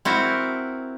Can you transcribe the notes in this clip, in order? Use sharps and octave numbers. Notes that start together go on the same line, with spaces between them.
C4 E4 F#4 A#4